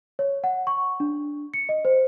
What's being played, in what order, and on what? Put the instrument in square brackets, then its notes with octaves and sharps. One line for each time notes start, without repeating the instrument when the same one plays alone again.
[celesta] C#5
F#5
C#6
D4
C#7
D#5
C5